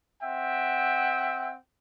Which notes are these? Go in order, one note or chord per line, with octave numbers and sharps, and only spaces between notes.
C4 E5 F#5 G5